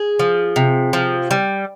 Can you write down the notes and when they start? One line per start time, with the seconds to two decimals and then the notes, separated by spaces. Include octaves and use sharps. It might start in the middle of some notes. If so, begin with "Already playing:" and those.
Already playing: G#4
0.19 F3
0.56 C3
0.93 F3
1.31 G3